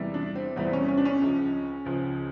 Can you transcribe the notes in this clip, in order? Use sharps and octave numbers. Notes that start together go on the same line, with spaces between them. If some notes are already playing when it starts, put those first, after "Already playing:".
Already playing: E2 C3 E3 G3
D4
C4
E2 C3 E3 G3 C4
C#4
C#4
D4
C#4
C#2 C#3 F3
C#2 C#3 F3